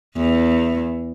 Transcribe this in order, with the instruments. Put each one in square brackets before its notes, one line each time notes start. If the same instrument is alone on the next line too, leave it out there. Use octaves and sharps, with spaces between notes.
[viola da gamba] E2